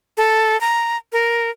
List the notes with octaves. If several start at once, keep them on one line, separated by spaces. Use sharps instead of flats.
A4
A#5
A#4